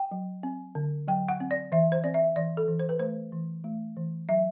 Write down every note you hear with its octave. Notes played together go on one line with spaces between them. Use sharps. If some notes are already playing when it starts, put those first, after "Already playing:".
Already playing: G5
F#3
C4
D3
F#3 G5
F#5
C4
D5
E3 E5
C5
C4 D5
E5
E3 D5
A4
E3
C5
B4
A3 C5
E3
A3
E3
F#3 E5